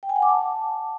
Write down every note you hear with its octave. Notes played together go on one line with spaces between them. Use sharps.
G5
G#5
F#5
D6
A5